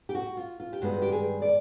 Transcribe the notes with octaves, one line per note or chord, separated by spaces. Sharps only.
G4
F#4
F4
F4
G4
G2 D#3 G#3 B3 F#4
G4
G#4
D5